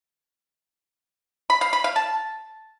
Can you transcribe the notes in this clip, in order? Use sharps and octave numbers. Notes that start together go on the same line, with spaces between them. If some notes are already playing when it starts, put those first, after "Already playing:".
B5
F5
B5
F5
A5